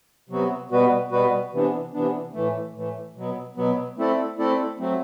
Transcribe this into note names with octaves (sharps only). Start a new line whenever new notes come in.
C3 F#3 B3 F#4
B2 G3 B3 F#4 B4
B2 G3 B3 F#4 B4
C3 E3 B3 D4
C3 E3 B3 D4
A2 E3 A3
A2 E3 A3
B2 F#3 B3
B2 F#3 B3
A3 C4 E4 A4 D5
A3 C4 E4 A4 D5
F#3 A3 C4